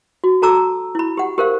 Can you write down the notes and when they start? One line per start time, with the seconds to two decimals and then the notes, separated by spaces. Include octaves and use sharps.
0.24 F#4
0.42 F#4 A4 A5 A#5 D6 E6
0.95 E4 B5
1.17 G4 F#5
1.38 G4 A#4 C5 F5